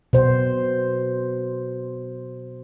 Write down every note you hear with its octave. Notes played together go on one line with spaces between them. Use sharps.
B2 C5